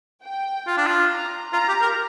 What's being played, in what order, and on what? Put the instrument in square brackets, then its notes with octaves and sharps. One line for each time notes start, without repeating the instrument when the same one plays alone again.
[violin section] G5
[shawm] F4
D4
F4
[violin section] A#5
[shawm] F4 [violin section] A#5
[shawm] G4
A#4